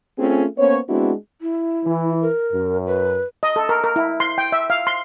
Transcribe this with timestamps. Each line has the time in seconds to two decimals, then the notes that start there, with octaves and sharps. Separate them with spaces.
0.19 A3 C4 C#4 F4 G#4 A4
0.58 A#3 B3 C#4 C5 C#5
0.89 G#3 B3 C4 D4 E4 F#4
1.42 E4
1.85 E3
2.22 A#4
2.52 F#2
2.87 B4
3.43 D#5
3.56 A4
3.69 A#4
3.84 A#4
3.96 E4
4.20 C6
4.38 G5
4.52 E5
4.70 F5
4.87 C6